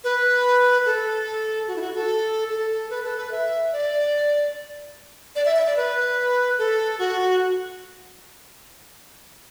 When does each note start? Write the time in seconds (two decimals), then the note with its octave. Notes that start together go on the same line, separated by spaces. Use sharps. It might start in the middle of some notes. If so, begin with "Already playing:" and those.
0.04 B4
0.86 A4
1.68 F#4
1.76 E4
1.81 F#4
1.95 A4
2.50 A4
2.90 B4
3.04 A4
3.18 B4
3.31 E5
3.72 D5
5.35 D5
5.46 E5
5.56 E5
5.66 D5
5.77 B4
6.58 A4
6.99 F#4